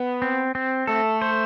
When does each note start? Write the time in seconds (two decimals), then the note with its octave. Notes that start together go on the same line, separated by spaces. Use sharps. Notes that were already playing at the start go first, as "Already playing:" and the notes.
Already playing: B3
0.22 C4
0.55 C4
0.87 A3 A4
1.22 C5